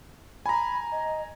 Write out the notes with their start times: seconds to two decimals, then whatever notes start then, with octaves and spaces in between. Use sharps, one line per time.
0.46 G#5 A#5 B5
0.92 D#5